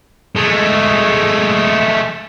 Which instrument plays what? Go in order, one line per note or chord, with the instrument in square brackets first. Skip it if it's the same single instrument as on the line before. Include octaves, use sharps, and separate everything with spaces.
[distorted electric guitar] G#3 A3